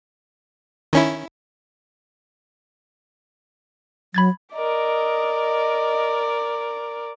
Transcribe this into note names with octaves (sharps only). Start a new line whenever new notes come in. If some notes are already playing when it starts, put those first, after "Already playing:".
D#3 C#4 E4
F#3 B5 G#6 A6
A#4 D5 D#5